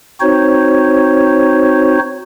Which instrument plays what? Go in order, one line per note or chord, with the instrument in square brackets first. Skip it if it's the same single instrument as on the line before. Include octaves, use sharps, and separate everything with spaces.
[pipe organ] C4 D#4 F#4 C5 C#5